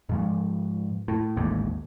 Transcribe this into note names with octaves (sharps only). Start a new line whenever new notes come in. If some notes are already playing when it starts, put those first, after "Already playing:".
G#2 F3 G#3
A2
A1 D#2 G#2